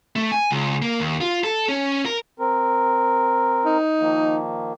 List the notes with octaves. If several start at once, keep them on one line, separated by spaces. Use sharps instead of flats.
A3
G#5
C#2
A#3
D#2
F4
A4
C#4
A#4
C4 A#4
D#4
D#3 F3 A#3